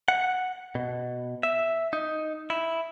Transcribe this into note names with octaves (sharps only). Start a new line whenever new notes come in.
F#5
B2
E5
D#4
E4